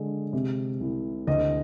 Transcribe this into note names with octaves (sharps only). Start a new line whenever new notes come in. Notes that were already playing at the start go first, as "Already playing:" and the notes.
Already playing: D3 G#3
C3
C2
D2 D#5